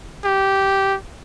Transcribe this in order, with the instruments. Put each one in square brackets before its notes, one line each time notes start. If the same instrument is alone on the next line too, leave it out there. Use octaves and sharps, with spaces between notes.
[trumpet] G4